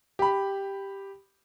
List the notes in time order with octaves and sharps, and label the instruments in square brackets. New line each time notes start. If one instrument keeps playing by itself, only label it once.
[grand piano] G4 B5